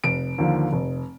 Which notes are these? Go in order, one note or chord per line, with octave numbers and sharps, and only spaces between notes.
F1 D7
D#2 D3 F3
F1